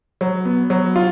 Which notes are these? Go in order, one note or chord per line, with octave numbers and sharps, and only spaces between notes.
F#3
B3
F#3
F4